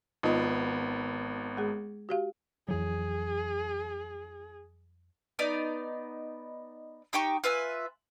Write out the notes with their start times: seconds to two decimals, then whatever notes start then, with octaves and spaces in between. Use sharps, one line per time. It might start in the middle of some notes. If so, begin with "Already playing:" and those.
0.23 G#1 B3 D#4 F4 D#5
1.57 G#3 G#4
2.09 F#4 G4 F5
2.68 F2 E3 F#3 G#4
5.39 B3 D#4 D5
7.13 D#4 G4 G5 C#6
7.44 F4 B4 E5 G#5